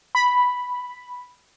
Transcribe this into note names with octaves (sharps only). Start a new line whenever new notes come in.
B5